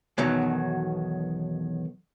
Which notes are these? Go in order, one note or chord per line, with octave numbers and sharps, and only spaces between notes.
B1 E2 B2 D#3 F#3